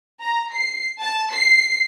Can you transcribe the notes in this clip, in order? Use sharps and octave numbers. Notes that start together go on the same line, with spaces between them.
A#5
C7
A5
C7